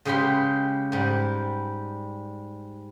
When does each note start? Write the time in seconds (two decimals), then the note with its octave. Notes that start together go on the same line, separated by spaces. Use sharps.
0.05 C#3 G#3 G4 B4 C6
0.92 G#2 G3